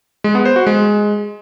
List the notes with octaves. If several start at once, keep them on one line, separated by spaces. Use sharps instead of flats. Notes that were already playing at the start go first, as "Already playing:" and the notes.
G#3
B3
C5
F#4
G#3